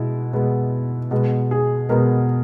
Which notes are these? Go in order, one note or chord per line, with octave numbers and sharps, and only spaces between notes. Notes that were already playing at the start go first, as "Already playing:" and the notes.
Already playing: B2 G#3 B3 E4
B2 G#3 B3
B2 G#3 B3
G#4
B2 G#3 B3 A#4